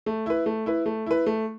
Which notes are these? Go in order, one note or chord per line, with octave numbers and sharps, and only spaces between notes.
A3
E4 B4
A3
E4 B4
A3
E4 B4
A3